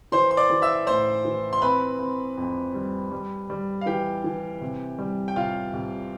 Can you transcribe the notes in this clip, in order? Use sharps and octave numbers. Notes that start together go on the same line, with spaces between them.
E3 C5 C6
C6
D5 D6
E3
E5 E6
A2 C5 C6
E3
C6
C4 B4 B5
C4
F2
G3
G3
G3
F5
E3 G4 G5
E3
C3
G3
G5
C2 F4 F5
C2